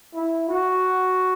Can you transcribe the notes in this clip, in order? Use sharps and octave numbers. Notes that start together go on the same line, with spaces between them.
E4
F#4